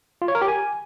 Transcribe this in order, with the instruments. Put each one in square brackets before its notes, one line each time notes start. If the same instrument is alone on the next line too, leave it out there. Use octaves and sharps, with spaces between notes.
[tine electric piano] F4
C#5
A#4
G4
G#5